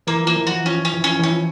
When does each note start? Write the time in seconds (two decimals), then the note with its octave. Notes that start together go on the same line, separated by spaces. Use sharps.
0.07 E3 A#3
0.23 F3 A#3
0.36 E3
0.47 E3 F#4
0.65 F3 C#4
0.85 C#4
0.94 E3
1.04 F3 C#4
1.19 E3 C#4
1.29 F3